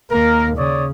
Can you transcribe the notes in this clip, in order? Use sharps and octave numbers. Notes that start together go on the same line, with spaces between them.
D#2 A#3 A#4
C#3 C#5 D5 D#6